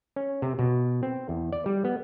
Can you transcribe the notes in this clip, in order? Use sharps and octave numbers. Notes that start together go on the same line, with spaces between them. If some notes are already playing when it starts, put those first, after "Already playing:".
C#4
C3
B2
C4
E2
D5
G3
B3